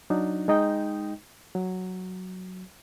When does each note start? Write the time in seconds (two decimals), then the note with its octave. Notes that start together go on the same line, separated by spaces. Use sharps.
0.10 F#3 D4 D#4
0.48 G#3 D#4 D#5 G5
1.55 F#3